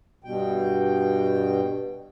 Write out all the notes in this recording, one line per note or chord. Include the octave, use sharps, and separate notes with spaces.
G2 B2 G5